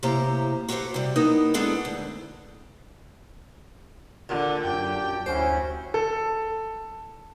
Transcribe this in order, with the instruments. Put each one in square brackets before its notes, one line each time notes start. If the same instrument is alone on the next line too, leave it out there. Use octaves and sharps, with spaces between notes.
[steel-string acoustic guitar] A2 C3 A#3 G4 C5 A#5
F#4 G4 A4 B4 C5
C3 G3
F#3 A#3 B3 D#4
G#3 B3 D4 D#4 G#4 A4
D2
[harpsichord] A#2 [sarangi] D3
[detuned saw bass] F#2 [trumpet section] D4 G4 [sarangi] G5
[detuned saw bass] D2 [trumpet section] C#4 E4 F#4 [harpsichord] C5
[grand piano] A4